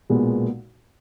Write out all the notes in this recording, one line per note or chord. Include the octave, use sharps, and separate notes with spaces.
B1 A#2 G#3 B3